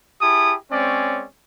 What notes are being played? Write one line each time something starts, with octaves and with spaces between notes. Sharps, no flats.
E4 G4 G#4 A5 D#6
G#3 C4 C#4 C#5 D5